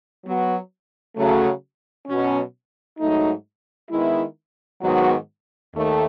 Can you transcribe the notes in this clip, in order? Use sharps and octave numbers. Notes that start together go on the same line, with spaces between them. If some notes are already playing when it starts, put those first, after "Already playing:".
F#3 B3 F#4
C#3 F#3 A3
B2 F#3 C#4
G#2 F#3 A3 D#4
D#3 G#3 B3 E4
G#2 D#3 F#3 B3 F#4
D#2 D#3 A3